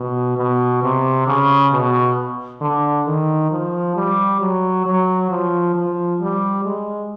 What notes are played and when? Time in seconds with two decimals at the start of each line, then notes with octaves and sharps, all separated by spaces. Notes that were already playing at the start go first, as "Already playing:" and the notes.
Already playing: B2
0.37 B2
0.82 C3
1.27 C#3
1.72 B2
2.61 D3
3.07 D#3
3.51 F3
3.96 G3
4.40 F#3
4.85 F#3
5.30 F3
5.75 F3
6.20 G3
6.64 G#3